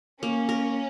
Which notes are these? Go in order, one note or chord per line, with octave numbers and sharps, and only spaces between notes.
A#3 C#4
A#4